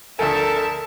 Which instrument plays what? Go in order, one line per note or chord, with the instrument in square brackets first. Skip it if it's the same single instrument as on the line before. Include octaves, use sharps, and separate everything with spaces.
[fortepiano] D2 F3 G#5 [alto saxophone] A4 [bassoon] A#4 [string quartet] E5 A5